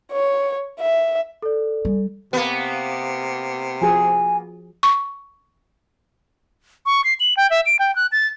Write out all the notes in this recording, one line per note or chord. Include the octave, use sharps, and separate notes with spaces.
C#5
E5
A4 D5
G3
C3 A#3 B3
F3 F#4 G#4 G#5
C#6
C#6
C7
F#7
G5
E5
D7
G5
F#6
A6